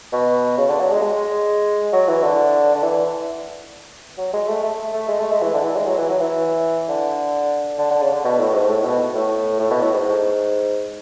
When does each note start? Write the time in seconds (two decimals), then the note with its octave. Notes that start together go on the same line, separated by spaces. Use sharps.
0.13 B2
0.57 C#3
0.69 D3
0.80 F#3
0.91 G#3
1.02 G#3
1.93 F#3
2.08 E3
2.23 D3
2.75 D3
2.83 E3
4.18 F#3
4.33 G#3
4.48 A3
4.63 A3
4.93 A3
5.08 G#3
5.20 A3
5.31 G#3
5.42 E3
5.54 D3
5.64 E3
5.76 G#3
5.87 F#3
5.98 E3
6.10 F#3
6.20 E3
6.88 D3
7.78 D3
7.91 D3
8.02 C#3
8.12 D3
8.24 B2
8.39 A2
8.54 G#2
8.69 A2
8.84 B2
9.15 A2
9.59 A2
9.70 B2
9.82 A2
9.93 G#2